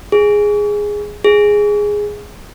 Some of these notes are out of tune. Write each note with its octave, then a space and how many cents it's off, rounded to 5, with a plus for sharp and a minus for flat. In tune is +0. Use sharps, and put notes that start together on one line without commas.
G#4 -5
G#4 -5